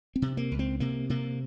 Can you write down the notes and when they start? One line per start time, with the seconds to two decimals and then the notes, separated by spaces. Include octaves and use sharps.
0.16 C4
0.22 C3
0.37 A#3
0.51 C#2
0.59 C4
0.80 C3 A#3
1.10 C3 A#3